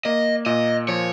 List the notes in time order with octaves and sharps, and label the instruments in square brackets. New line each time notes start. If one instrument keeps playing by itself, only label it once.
[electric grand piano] A#3 [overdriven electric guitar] D#5
[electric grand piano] A#2 [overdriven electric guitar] D#5
[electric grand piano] F3 [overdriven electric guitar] C#5